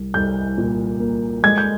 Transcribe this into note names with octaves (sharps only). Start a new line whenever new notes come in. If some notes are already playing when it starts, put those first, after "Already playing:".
Already playing: C2
C2 G6
A#2
A#3
G#3 G#6
G6